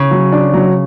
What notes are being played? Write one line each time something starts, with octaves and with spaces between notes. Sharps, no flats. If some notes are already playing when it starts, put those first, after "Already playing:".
Already playing: C#3
F#3
D4
F#3